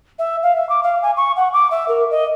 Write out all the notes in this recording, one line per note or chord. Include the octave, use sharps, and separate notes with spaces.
E5
F5
E5
D6
F5
G#5
C#6
F#5
D6
E5
A#4
D#5